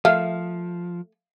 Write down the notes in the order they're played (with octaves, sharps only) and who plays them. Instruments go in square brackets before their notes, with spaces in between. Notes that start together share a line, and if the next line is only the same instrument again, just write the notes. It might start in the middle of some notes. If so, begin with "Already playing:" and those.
[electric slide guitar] F3 [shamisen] A3 [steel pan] F5